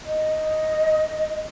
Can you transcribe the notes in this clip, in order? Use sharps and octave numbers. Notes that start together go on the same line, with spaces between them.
D#5